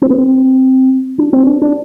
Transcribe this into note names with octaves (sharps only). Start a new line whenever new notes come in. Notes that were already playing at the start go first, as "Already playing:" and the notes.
C4
B3
C4
D4
C4
D4
D4